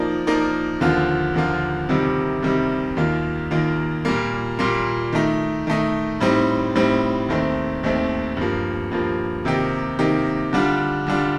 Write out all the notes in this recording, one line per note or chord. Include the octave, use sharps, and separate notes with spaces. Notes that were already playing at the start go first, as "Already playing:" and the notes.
Already playing: F3 A#3 D#4 A#4 D5
F3 A#3 D#4 A#4 D5
D#2 D3 F3 A#3 F4
D#2 D3 F3 A#3 F4
C2 C3 D#3 G3
C2 C3 D#3 G3
D#2 D#3 A#3 F4
D#2 D#3 A#3 F4
A#2 G3 A#3
A#2 G3 A#3
D#3 A3 D#4
D#3 A3 D#4
A2 G3 C4 D#4
A2 G3 C4 D#4
D#2 D#3 A3 C4
D#2 D#3 A3 C4
G2 F3 A#3
G2 F3 A#3
C3 D#3 A#3 D#4 G4
C3 D#3 A#3 D#4 G4
D3 G3 D4 F4
D3 G3 D4 F4